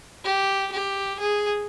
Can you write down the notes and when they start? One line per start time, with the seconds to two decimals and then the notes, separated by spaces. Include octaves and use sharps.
0.24 G4
0.72 G4
1.20 G#4